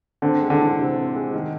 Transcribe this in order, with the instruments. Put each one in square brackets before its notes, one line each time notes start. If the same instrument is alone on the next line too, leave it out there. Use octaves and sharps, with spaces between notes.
[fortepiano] D3 [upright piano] C4
[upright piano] G#3
[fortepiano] D3
[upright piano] E3
C3
C4
G#3
D#3